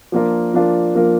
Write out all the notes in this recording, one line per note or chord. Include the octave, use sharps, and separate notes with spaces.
F3 A#3 D4 F4 A#4
F3 A#3 D4 F4 A#4
F3 A#3 D4 F4 A#4